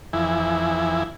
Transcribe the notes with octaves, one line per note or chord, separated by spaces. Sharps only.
F2 E3 E4 G#5